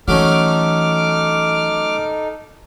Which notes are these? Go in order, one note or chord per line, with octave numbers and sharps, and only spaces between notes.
E3 F#3 A3 C#4 D#4 A4 D6 F6